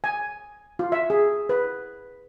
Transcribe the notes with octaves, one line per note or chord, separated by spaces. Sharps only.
G#5
F4
E5
G#4
B4